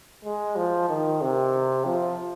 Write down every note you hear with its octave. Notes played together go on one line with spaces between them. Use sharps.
G#3
F3
D#3
C3
F3